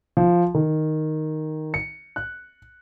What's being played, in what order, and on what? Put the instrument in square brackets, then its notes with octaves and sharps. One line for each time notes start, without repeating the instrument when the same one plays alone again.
[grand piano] F3
D#3
C#7
F#6